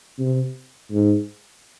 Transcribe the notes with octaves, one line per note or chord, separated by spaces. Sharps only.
C3
G#2